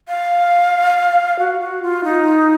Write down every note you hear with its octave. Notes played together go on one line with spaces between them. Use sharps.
F5
F#4
F#4
F4
D#4